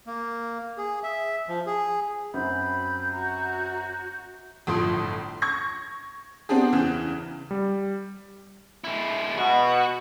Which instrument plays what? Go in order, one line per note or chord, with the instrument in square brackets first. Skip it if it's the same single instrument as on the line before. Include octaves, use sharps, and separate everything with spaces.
[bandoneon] A#3
G#4
E5
F3
G#4
[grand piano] F#2 C4 [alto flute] B5 [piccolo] G6
[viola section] F#4 [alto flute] A#5
[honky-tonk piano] G1 A2 F3 C6 D#6 D7
C#6 G#6 A#6
B3 C4 D4 G4 G#4
E2 C#3 E3
[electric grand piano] G3
[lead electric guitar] G#3 E4
[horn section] B2 [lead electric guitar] F#4